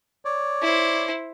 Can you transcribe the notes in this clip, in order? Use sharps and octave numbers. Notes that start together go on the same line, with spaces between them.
C#5 D5
E4 C5